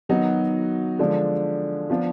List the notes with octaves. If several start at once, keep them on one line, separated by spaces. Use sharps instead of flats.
D#3 F#3 B3 D#4 F#4
D3 F3 G#3 D4
F3 B3 D4 F4